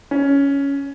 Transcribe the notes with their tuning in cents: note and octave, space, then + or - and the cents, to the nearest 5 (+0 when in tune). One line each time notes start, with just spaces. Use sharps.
C#4 +10